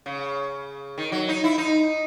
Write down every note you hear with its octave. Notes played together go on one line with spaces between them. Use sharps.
C#3
D#3
F#3
D#4
E4
D#4